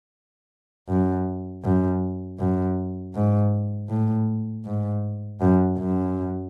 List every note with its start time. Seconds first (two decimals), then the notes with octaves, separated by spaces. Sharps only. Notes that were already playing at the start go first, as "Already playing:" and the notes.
0.89 F#2
1.64 F#2
2.39 F#2
3.14 G#2
3.90 A2
4.66 G#2
5.41 F#2
5.78 F#2